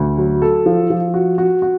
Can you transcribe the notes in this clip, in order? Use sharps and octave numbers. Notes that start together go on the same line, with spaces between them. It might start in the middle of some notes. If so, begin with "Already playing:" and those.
Already playing: D2
F#3
A4
F3
F3
F#4
F#4
F#4